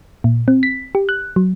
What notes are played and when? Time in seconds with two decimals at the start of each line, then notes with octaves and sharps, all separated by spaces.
0.24 A#2
0.48 C4
0.63 B6
0.95 G4
1.09 F#6
1.36 F#3